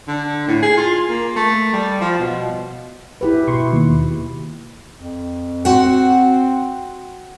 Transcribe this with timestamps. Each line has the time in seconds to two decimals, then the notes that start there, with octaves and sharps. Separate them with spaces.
0.08 D3
0.48 A2
0.62 G#4
0.77 F4
1.09 A#3
1.36 A3
1.73 G3
2.01 F3
2.19 B2
3.21 E4 G4 B4
3.47 B2 C6 C#6
3.73 D#2
4.95 F2
5.65 C4 F#4 F#5